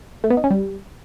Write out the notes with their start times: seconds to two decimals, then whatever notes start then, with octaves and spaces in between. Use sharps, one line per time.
0.24 A3
0.30 B3
0.37 D#4
0.44 C#4
0.51 G3